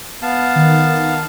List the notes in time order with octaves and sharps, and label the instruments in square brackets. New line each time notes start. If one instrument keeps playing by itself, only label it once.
[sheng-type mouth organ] B3 F5 A5
[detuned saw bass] D#3